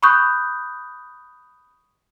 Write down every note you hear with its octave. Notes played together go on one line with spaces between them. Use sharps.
B5 C#6 D#6 F#6 G6